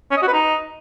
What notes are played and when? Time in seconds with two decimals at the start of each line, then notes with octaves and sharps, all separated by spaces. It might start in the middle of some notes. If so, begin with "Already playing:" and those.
0.11 C#4
0.17 D#5
0.22 F#4
0.28 B4
0.33 D#4